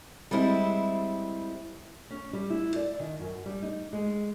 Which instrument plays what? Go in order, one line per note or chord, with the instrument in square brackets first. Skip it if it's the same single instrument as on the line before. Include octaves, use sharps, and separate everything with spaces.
[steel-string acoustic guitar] G3 G#3 C4 E4
[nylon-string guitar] C#4
G3
E4
D5
D#3
F#2
G3
D#4
G#3